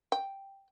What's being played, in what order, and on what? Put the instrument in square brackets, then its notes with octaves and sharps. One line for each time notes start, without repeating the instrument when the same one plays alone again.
[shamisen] G5